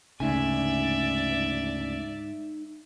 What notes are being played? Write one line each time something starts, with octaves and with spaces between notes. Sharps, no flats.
D2 G#2 C#3 D#4 G#4 D5 E5 G#5